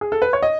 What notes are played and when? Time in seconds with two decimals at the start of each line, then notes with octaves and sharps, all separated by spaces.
0.01 G#4
0.12 A4
0.22 B4
0.33 C#5
0.42 D#5